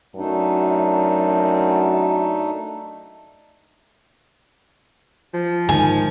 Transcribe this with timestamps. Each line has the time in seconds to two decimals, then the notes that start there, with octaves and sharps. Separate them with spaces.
0.15 F#2 A3 D4 D#4
5.34 F3
5.69 G#2 D3 D#3 G#5